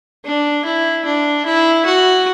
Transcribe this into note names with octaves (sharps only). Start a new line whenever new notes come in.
D4
E4
D4
E4
F#4